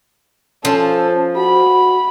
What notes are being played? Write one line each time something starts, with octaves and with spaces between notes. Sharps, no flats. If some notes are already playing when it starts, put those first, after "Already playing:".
F3 C#4 A4
F#4 B5